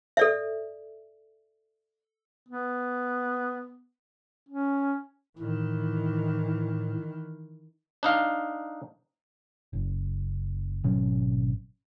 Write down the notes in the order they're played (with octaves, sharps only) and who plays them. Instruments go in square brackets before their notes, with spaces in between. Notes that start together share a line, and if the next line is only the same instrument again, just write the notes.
[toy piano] A4 D5 E5
[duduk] B3
C#4
[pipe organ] A2 [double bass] D#3 E3
[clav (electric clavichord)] D4 D#4 F5
[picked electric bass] F#1
G#1 B2 F#3 C#4